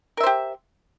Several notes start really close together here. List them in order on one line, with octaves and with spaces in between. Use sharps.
A#4 E5 C5 G4